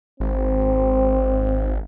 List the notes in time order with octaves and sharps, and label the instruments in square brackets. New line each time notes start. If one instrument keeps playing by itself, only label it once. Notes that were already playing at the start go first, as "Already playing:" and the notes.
[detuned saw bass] G#1 [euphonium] C4